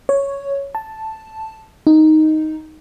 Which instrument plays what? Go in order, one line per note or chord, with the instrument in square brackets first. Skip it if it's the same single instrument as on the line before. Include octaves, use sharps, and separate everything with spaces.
[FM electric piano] C#5
A5
D#4